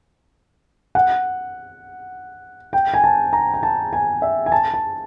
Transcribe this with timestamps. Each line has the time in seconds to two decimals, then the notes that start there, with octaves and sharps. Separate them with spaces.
0.95 F#5
2.73 G5
2.94 G#5
3.04 A5
3.33 A#5
3.54 A#5
3.63 A5
3.93 G#5
4.22 E5
4.46 G#5
4.52 A5
4.74 A5